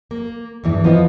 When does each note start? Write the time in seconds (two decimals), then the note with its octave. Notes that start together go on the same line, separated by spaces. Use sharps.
0.11 A#3
0.64 E2 G2 E3
0.84 F3 B3 E4 F4 D#5